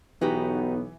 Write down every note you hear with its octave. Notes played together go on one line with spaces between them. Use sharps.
B1 E3 B3 D#4 F#4 G4